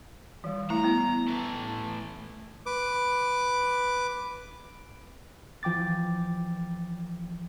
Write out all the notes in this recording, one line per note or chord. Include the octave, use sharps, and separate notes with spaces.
E3 G3
A3 E4 A#5
B3
E3 A3
B4 D6
E3 F3 G5 D6 A6